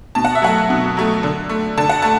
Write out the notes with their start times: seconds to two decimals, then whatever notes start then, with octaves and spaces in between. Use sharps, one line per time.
0.15 B2 A5
0.25 F#5
0.35 E5
0.42 F#3 A3 F#5
0.70 B2
0.97 F#3 A3
1.23 D3
1.49 A3
1.78 D3 A5
1.89 F#5
2.02 A3 A5